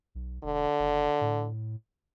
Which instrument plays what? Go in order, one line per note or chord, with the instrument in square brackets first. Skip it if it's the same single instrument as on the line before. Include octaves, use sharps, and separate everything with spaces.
[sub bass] B1
[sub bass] E1 [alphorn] D3
[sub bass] F#1
A2